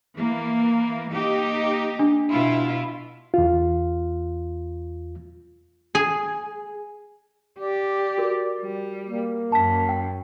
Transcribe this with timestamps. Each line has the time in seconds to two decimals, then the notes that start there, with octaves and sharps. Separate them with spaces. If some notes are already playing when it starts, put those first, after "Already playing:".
0.17 E3 A#3
1.11 A#3 D#4 G4
1.99 D4
2.31 B2 E4 F4
3.34 E2 F4
5.95 G#4
7.59 G4 D5
8.18 F#4 A#4
8.61 G3
9.06 A#3
9.52 F#2 A5 B6
9.89 G5